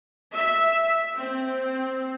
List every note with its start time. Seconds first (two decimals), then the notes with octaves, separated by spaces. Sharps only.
0.35 E5
1.17 C4